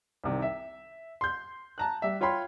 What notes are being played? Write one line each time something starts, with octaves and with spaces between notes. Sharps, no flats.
C2 C3 D#3
E5
C6 G6
A5 A#5 F#6
G3 E5
F4 C#5 G5 B5 C6